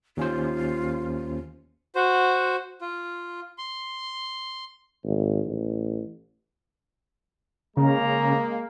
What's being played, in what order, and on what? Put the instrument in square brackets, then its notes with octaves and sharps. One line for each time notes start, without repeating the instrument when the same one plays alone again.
[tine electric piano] D#2 C#4 C5 [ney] F4
[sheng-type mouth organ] F#4 C5
F4
C6
[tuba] G#1
A1
[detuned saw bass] C#3 [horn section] G#3 A#3 [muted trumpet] A#5